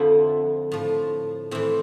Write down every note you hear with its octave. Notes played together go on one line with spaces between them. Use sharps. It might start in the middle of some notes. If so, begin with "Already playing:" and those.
Already playing: F2 D3 F3 E4
A2 F3
A2 E3 C4